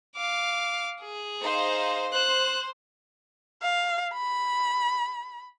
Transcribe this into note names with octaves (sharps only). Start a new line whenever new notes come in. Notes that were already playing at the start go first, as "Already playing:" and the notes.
F5 D6
G#4
D#4 C5 F5
C5 F#6
F5
B5